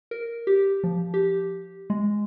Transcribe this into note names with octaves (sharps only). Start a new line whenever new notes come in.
A#4
G4
F3
G4
G#3